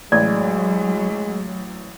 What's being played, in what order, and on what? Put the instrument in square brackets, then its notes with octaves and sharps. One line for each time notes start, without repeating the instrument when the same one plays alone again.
[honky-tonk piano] A1 [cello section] F#3 [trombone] G#3 [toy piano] D5